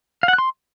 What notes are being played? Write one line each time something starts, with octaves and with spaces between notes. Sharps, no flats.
F5
F#5
F#6
C6